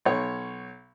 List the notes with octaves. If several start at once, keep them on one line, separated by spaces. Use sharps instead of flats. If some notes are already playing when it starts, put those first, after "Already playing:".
B1 C#5